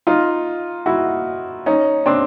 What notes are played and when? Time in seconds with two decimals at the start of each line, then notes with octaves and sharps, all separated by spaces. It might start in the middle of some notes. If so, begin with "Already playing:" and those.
0.07 D#4 F4
0.86 E4 F#4
1.66 C#4 D#4
2.06 C4 D4